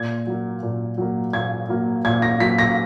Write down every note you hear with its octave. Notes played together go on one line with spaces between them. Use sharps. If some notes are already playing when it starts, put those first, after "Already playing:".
Already playing: A#2 G#6
F#3 A#3
A#2
F#3 A#3
A#2 G#6
F#3 A#3
A#2 G#6
A#6
F#3 A#3 B6
A#6